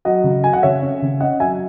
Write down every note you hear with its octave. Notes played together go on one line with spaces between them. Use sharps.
F#3 D#5 F#5
C#3
F#3 G#5
F#5
C#3 C#5 E5
C#4
C#3
C#4 D#5 F#5
F#3 E5 G#5